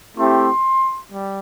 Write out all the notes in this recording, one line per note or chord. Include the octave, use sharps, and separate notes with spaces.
A3 C4 E4 G4 C6
G3